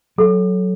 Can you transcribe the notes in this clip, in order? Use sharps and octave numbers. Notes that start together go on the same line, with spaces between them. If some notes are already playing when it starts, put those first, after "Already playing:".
F#3 A4